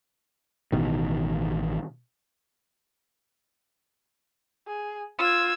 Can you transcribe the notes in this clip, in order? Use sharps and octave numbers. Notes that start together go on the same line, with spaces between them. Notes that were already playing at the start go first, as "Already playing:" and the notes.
A1 B2 D#3
G#4
F4 E6 G#6